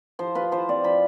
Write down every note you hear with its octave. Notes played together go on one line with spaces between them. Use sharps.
F3 C5
F4 B4
F3 C5
C4 D5
F3 B5